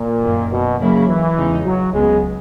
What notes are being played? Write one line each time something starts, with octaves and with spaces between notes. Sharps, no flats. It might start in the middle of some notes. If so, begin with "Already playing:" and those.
Already playing: A#2
F#2 D#3 A#3
B2
C#3 F#3 A#3 E4
E3
E2 C#3 G#3 D#4
F#3
C#2 C#3 F#3 G#3 B3